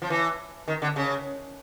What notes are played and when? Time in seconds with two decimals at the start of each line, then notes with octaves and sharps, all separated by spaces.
0.02 F3
0.10 E3
0.68 D#3
0.82 D3
0.96 C#3